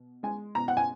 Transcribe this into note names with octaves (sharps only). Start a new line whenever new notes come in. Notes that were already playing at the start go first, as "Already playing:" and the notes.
Already playing: B2
G#3 G#5
B2 A#5
F#5
G#5